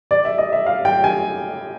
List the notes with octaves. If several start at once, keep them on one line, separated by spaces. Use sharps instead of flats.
D5
E5
D#5
E5
F5
G5
G#5